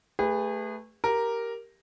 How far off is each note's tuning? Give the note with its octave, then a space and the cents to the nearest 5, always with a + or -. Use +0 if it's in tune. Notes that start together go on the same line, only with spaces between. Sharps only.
A3 +0 G#4 -35 B4 +0
G4 +0 A#4 +0